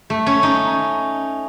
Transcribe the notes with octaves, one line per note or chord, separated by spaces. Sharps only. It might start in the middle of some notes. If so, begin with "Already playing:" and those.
A3
C#4
D#4